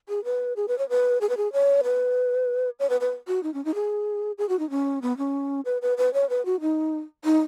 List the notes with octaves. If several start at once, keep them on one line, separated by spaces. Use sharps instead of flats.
G#4
B4
G#4
B4
C#5
B4
G#4
B4
G#4
C#5
B4
C#5
B4
B4
F#4
D#4
C#4
D#4
G#4
G#4
F#4
D#4
C#4
B3
C#4
B4
B4
B4
C#5
B4
F#4
D#4
D#4